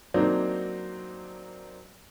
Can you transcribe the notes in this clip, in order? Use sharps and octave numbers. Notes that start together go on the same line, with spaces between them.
F#3 A#3 C4 D4 D#4